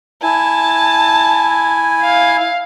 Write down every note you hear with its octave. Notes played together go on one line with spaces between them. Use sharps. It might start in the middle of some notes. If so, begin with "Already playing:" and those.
E4 G#5 A5
F5